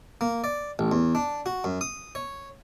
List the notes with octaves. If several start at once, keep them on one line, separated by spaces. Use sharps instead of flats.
A#3
D5
A1
E2
D4
F#4
F#2
D#6
C#5